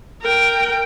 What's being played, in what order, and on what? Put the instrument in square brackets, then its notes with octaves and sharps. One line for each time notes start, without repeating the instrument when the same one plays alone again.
[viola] A#4 G5